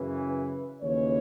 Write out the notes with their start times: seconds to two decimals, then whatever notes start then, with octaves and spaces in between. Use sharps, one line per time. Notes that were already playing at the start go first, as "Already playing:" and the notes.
Already playing: F#2 C#3 E3
0.30 B4
0.81 D#2 C#3 E3 C#5